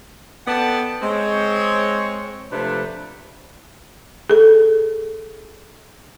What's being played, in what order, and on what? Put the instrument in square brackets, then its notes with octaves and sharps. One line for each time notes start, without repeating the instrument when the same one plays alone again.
[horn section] B3 A4 D5 F#5 G5 A5
G#3 C4 C#5
C3 F3 A3 D4 B4
[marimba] G#4 A4